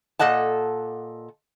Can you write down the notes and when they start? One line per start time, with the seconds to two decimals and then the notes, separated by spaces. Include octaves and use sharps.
0.19 A#2 A4 D#5 F#5 A5